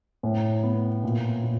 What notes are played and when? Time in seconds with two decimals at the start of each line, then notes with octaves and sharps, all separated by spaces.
0.23 A2
0.63 B3
1.03 A#2
1.43 A#2